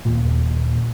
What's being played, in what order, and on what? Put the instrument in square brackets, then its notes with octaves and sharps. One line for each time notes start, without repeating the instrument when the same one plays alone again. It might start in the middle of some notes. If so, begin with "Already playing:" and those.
[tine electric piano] D#2 A#2